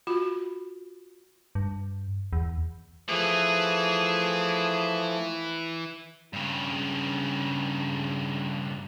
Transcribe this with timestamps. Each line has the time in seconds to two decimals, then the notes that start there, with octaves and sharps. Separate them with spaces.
0.07 F4 F#4 B5
1.55 G2
2.33 E2
3.09 E3 F3 A3 G#4
6.33 G2 C#3